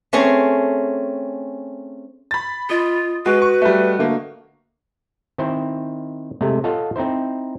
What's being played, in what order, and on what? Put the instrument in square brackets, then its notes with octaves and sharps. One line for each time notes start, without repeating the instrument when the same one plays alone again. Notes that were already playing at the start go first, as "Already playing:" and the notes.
[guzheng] A3 C4 C#4 G#4
[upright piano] B5 A6
[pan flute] F4 [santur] D#5
[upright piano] G#3 [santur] F#4 [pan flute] B4
[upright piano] C#6
G3 A3
D3 A3 A#3
[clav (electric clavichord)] D#3 C4 E4 C5
C3 G#3 A3
F4 A4 C#5 D#5 F5 F#5
C4 D#4 E4 C5